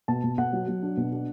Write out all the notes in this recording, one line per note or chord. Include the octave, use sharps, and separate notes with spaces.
B2 A5
B2
B2 F#5
F#3
F#3
D4
B2
D4